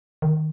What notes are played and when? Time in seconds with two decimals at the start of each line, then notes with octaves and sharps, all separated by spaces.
0.22 D#3